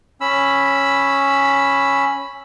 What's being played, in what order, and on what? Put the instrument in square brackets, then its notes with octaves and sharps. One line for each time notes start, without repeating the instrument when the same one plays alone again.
[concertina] C#4 B5 E6